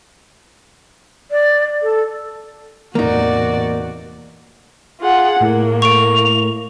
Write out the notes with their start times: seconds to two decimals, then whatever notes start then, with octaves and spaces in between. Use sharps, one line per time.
1.31 D5
1.83 A4
2.95 E2 A2 C3 A#3 D#4 F#4 D5
5.01 F4 G#4 F#5
5.40 A2 A3 A#3
5.82 C#6 D7 F7